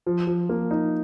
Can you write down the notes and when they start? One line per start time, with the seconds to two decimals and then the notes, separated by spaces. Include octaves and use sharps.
0.06 F3
0.27 F3
0.49 A#3
0.71 D#4